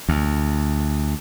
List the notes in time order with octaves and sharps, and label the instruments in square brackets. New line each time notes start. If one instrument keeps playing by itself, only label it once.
[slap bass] D2